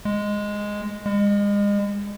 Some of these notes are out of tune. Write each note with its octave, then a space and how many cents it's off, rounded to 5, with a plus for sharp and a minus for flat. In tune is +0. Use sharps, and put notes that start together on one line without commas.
G#3 -5
G#3 -35